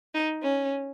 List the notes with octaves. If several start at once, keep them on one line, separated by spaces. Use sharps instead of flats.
D#4
C#4